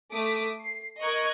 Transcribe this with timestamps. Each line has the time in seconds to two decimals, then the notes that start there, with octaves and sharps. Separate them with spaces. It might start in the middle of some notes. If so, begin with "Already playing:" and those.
0.12 A3 D6 D#6 B6
0.60 C7
1.00 A#4 D#5 C#6 F#6 G#6